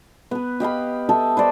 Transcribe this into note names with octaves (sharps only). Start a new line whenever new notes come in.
B3 B4
G4 D#5 F5 B5
A4 D#5 E5 A5
B4 C5 D5 A#5